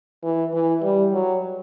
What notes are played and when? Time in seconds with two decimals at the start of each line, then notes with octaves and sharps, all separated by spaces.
0.24 E3
0.54 E3
0.83 G3
1.13 F#3